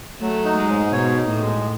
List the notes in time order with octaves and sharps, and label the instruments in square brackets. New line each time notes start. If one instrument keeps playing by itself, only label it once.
[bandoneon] F#3 [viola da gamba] A3
[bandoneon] D#4
[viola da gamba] G#3
[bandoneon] G#2
[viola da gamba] B2 [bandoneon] C#5
[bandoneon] D#4
[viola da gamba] A2
[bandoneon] G#3